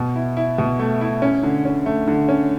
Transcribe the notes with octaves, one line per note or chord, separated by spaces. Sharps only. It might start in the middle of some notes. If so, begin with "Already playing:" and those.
Already playing: B2
E4
E4
B2
A3
E4
C#4
D3
C#4
A3
D3
C#4